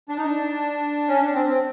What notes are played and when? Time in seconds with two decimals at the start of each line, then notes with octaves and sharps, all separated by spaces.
0.09 D4
0.18 D#4
0.26 D4
1.08 C#4
1.21 D4
1.33 C4
1.46 C4